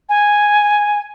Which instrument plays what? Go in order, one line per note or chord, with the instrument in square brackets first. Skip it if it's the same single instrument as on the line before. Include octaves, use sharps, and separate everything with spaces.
[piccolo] G#5